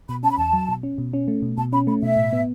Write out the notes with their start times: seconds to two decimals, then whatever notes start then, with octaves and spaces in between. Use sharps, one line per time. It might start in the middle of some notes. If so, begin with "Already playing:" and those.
0.09 B2 B5
0.23 C#4 A5
0.31 B5
0.38 E2 A5
0.53 F#3
0.69 B2
0.83 C#4
0.98 B2
1.13 C#4
1.28 A3
1.42 B2
1.58 B2 A5
1.73 C#4 B5
1.87 A3 B5
2.02 B2 E5
2.17 A2
2.33 B3